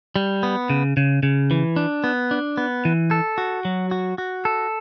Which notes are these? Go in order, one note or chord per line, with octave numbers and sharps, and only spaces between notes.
G3
B3
C#3
C#3
C#3
E3
D4
B3
D4
B3
E3
A4
F#4
F#3
F#4
F#4
A4